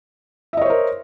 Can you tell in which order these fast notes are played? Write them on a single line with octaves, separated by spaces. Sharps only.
E5 D#5 C#5 C5 A#4